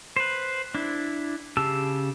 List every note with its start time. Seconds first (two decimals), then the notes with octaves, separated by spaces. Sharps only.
0.16 B4 C5
0.75 D4 E4
1.57 C#3 G4 A5 E6